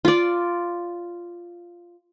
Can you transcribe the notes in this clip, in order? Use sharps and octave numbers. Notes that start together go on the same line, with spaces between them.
F4 D5